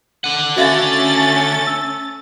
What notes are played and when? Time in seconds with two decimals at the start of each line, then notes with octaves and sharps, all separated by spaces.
0.24 D3 F#5 D#7
0.57 A3 C#4 F#4 E5 F5 A6
1.67 E6